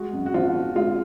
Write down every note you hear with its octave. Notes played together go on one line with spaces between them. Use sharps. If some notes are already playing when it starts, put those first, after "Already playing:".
Already playing: G#3 F#4
F#2
F#4
F3 F4
D3
G#3 F4